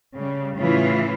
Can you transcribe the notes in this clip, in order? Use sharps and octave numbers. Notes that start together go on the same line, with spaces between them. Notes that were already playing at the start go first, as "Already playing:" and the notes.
C#3 G3
A2 C#3 E3 F4